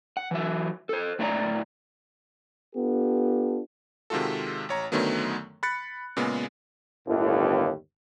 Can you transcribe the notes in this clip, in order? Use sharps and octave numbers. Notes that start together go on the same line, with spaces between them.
F#5
E3 F#3 E5
A4 C5
A2 D4 E4 C#5 D5 A#5
B3 D4 F4 G4 A4
C3 D#3 G#3 F4 F#4 A4
A1 C#5 A#5
F#2 D3 D#3 F#3 A3 B3
B5 F#6 A6 C#7
A#2 C#3 G#3 B3
G1 D#2 A2